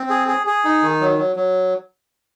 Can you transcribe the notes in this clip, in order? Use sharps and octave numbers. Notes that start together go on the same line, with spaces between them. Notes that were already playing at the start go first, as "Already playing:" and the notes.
Already playing: C4
G#4
G#4
G#4
D#4
D#3
F#3
F#3
F#3